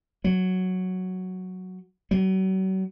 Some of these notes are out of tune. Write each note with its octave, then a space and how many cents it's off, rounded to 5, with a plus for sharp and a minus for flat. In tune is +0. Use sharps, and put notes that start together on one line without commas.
F#3 +0
F#3 +40